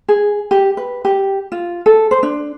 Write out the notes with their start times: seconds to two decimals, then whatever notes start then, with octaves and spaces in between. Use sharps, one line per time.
0.08 G#4
0.51 G4
0.77 B4
1.05 G4
1.52 F4
1.86 A4
2.11 C5
2.23 D4